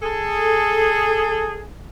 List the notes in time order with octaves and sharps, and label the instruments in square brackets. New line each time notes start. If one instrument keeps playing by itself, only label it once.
[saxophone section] G#4 A4